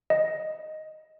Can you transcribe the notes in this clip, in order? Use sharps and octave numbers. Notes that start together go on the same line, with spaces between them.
D#5